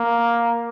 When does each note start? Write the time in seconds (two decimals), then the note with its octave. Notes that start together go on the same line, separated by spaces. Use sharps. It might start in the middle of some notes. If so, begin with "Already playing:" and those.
Already playing: A#3